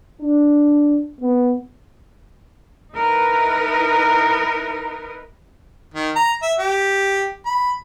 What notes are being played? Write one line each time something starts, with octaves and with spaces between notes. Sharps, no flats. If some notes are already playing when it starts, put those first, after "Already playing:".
D4
B3
D#4 E4 A#4 B4
D#3
A#5
E5
G4
B5